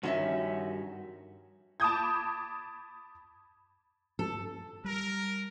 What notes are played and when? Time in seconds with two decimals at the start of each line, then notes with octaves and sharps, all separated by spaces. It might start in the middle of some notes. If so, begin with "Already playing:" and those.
0.03 G2 D#3 C#4 F#4 E5
1.80 A5 B5 D6 D#6 G6 G#6
4.19 A4
4.84 G3 A#4